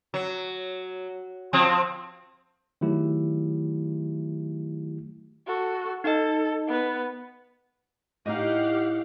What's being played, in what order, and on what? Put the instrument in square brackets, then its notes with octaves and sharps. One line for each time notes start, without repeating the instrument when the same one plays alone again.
[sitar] F#3
F3 C4
[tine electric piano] D#3 F#3 A3 E4 G4
[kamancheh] F#4 A4
[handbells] D#4 D#5 [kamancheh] A4
[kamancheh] B3 B4
[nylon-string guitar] A2 D#4 [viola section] G4 F5 F#5 [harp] D#5